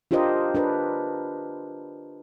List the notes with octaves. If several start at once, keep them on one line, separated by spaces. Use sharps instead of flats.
D4 F4 G4 A#4 C5 D#5
D4 A#4 B4